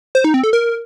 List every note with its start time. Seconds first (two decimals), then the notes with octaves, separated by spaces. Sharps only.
0.15 C5
0.24 D#4
0.34 C4
0.43 A4
0.53 A#4